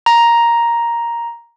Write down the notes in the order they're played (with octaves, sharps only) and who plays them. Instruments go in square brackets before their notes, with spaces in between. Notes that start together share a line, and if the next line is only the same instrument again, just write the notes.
[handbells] A#5